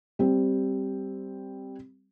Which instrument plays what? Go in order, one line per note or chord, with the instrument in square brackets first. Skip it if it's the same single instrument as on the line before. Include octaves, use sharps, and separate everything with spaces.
[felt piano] G3 C4